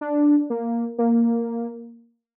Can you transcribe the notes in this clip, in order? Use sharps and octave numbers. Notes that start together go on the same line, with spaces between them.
D4
A#3
A#3